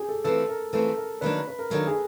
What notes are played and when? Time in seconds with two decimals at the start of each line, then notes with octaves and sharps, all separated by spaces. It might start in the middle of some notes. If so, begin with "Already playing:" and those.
Already playing: G4 G#4
0.09 A4
0.24 E3 A3 C4 F4 A4
0.49 A#4
0.73 E3 A3 C4 F4 A4
0.97 A#4
1.21 D#3 F#3 A#3 D4 B4
1.48 B4
1.59 A#4
1.70 D#3 F#3 A#3 D4 A4
1.87 G#4